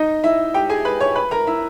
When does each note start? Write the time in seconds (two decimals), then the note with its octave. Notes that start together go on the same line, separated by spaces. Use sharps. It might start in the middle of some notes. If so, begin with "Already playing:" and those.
Already playing: D#4 D#5
0.24 E4 E5
0.54 G4 G5
0.69 G#4 G#5
0.85 B4 B5
1.00 C#5 C#6
1.16 B4 B5
1.31 A#4 A#5
1.47 E4 E5